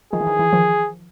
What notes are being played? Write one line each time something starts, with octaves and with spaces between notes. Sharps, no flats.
D#3 F3 G#4
E3
D#3
E3
D#3 F3